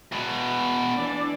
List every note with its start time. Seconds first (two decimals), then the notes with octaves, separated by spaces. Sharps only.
0.12 E2 B2
0.96 E3 D4 D5